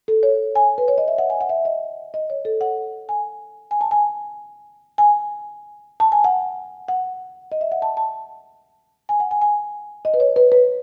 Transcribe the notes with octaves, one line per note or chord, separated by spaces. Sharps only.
A4
C#5
G#5
B4
C#5
D#5
E5
F#5
G#5
F#5
E5
D#5
D#5
C#5
A4
F#5
G#5
G#5
A5
G#5
G#5
A5
G#5
F#5
F#5
D#5
E5
F#5
A5
A5
G#5
F#5
G#5
G#5
D#5
B4
C#5
B4
B4